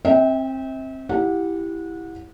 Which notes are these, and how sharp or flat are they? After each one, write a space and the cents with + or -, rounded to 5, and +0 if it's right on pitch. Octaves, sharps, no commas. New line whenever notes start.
C4 +25 E5 -35 G5 -20
E4 +0 G4 +0 F#5 -25